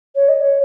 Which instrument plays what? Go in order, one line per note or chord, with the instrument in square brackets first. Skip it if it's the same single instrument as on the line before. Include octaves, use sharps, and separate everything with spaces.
[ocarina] C#5
D#5
C#5